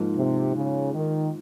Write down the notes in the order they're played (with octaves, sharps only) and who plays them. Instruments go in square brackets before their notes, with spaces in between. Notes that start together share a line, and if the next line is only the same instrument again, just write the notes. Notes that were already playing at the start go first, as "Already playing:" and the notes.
Already playing: [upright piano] G#2 F3 A#3
[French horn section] C3
C#3
D#3